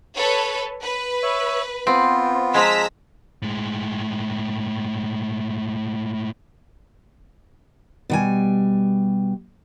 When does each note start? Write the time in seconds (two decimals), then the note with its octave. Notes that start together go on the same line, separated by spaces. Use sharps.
0.17 A4 B4 C#5
0.82 B4
1.23 C#5 E5
1.87 B3 C4 F4
2.54 F3 G#3 A#5 E6 B6
3.42 A2 G#3
8.10 B2 G3 G#5